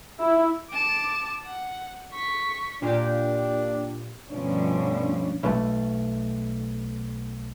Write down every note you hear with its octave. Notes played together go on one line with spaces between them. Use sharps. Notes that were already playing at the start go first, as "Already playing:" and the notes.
E4
A5 D6
F#5
C#6 B6
A#2 A#3 D4 G4
D2 G2 B2 F3 C#4 D4
B1 B2 A3